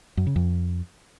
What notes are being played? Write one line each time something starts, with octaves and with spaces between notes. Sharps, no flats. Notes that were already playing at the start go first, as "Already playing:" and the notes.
F#2
C#3
F2